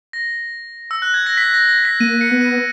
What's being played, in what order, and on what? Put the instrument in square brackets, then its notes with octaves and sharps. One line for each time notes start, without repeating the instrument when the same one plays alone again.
[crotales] A#6
E6
F#6
G#6
A#6
B6
A#6
A#6
B6
[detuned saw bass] A#3 [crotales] D#7
[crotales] C#7
[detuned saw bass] B3
[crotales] D#7